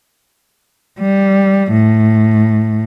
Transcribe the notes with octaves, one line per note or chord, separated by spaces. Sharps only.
G3
A2